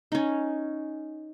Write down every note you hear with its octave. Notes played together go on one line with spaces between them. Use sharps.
C#4 D#4